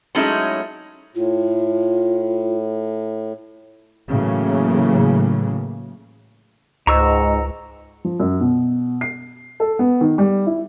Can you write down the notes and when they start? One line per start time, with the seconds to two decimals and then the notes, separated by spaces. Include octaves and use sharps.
0.15 F#3 G#3 A3 C#4 D#4 E4
1.15 A2 F4
4.09 A2 C#3 E3 F#3 A#3
6.87 C#2 G#2 D#5 A#5 C#6 E6
8.05 F3
8.20 F#2
8.40 B2
9.01 C7
9.60 A4
9.79 B3
10.01 D#3
10.18 G3
10.47 E4